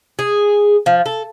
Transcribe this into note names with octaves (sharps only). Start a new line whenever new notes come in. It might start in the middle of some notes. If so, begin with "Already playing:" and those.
G#4
F3
A4